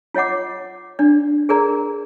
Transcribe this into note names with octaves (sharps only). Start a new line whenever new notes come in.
F4 C#5 D#5 F#5 D6
D4 D5
G#4 A#4 D5 A#5